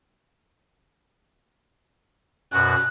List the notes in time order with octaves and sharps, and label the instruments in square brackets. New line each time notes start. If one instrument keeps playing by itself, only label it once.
[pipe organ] F#2 B2 F#4 [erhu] F#6